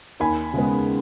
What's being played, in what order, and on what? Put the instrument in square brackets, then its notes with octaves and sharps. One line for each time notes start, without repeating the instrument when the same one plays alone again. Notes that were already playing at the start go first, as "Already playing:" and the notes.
[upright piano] D#2 G#5 B5
C#3 G#3 B3